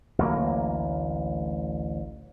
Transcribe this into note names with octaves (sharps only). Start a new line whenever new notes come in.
A1 D2 F#3 A#3